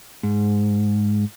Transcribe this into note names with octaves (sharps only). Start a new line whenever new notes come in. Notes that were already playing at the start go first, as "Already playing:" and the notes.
G#2